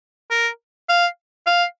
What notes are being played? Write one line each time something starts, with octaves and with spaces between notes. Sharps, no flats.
A#4
F5
F5